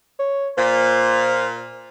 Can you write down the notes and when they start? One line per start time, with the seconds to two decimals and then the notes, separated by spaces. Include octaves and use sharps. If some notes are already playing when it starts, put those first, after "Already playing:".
0.19 C#5
0.58 A#2 C5